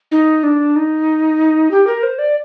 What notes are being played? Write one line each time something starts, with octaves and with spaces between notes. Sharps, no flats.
D#4
D4
D#4
G4
A#4
C5
D5